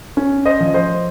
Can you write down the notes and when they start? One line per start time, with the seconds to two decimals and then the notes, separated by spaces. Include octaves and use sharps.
0.17 C#4
0.45 C5 D#5
0.61 F3
0.74 C5 D#5